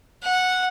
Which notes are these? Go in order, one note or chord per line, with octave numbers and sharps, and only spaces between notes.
F#5